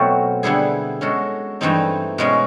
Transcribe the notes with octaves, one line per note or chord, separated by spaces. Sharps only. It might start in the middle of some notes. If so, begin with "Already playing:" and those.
Already playing: B2 F#3 A3 C4 F4
D3 G3 B3 E4 G#4
G#3 C#4 F#4 A4
G2 E3 A3 C4 D#4
B2 G#3 C#4